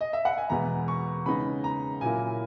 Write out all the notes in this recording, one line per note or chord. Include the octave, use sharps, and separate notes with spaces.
D#5
E5
F#5
G#5
E2 B2 G#3 B3 A#5
C#6
C#3 G#3 B3 D#4 B5
A#5
A#2 F#3 A#3 E4 G#5